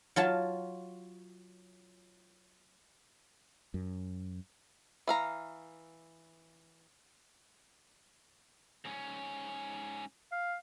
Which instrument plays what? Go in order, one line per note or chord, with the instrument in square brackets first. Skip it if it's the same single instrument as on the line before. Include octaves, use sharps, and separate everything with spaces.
[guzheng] F#3 F4 A5
[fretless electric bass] F#2
[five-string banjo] E3 F5 A#5
[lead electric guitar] G#2 C#4
[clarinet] F5